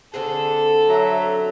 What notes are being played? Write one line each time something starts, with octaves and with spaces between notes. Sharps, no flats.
D3 C4 G#4 A4
F#3 E5 A#5